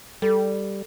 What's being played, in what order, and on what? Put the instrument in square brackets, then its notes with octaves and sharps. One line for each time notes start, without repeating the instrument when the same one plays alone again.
[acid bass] G3 [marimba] A4